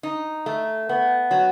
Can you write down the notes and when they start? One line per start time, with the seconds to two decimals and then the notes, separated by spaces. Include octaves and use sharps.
0.03 D#4
0.46 A3
0.89 B3
1.31 F#3